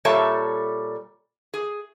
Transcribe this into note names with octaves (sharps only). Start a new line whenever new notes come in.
A#2 G3 A4 C#5 E5 A5
G#4